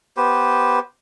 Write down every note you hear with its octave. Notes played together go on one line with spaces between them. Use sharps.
B3 G4 B4 C5